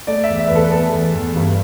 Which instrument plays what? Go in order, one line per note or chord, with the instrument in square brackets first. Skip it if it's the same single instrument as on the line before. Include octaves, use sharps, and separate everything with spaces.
[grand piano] A3 D5
E2 E5
E5
E2 B4
A4
B4
E2 A4
E2
E2
G2